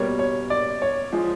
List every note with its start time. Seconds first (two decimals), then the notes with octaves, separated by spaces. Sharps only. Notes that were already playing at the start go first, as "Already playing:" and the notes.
Already playing: B2 G3 A#3 C#5
0.19 C#5
0.50 D5
0.82 C#5
1.12 F3 G#3